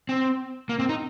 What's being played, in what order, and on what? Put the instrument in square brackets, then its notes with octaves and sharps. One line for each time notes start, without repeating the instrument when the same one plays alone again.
[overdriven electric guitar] C4
A#3
C4
D#4